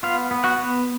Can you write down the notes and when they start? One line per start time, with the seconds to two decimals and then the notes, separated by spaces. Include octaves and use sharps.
0.03 B3 F4 F5
0.31 B3
0.44 F#4 F#5
0.58 B3